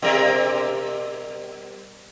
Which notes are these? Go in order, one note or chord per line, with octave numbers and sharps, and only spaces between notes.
B2 G3 A#4